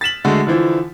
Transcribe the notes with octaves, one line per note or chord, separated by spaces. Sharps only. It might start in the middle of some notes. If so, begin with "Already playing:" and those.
A6 B6 E7 F#7
D3 G#3 A3 F#4
D3 E3 F3 E4